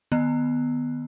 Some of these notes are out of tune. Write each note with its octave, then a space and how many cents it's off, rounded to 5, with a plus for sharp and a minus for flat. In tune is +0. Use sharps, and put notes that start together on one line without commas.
D#3 -30 B3 +0